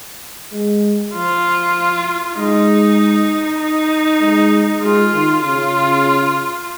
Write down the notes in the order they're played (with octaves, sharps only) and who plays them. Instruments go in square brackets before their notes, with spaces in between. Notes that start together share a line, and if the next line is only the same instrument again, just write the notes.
[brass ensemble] G#3
[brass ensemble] F3 [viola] F4
[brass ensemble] G#3 [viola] D#4
[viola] D#4
[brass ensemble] G#3
[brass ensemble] G#3 [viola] F4
[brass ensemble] D#3
[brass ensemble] C#3 [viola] F4